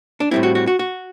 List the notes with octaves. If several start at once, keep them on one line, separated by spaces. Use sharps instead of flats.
D4
A2 G3 C4 E4
F#4
F#4
F#4
F#4